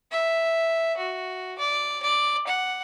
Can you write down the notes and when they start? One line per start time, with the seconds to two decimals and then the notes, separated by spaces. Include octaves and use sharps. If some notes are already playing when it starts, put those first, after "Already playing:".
0.12 E5
0.97 F#4
1.59 D5
2.03 D5
2.47 F#5